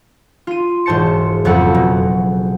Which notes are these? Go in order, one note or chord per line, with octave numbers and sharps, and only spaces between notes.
F4 D#7
E1 G#2 C5 A5 C#7
F#1 F2 A4 F#5
B2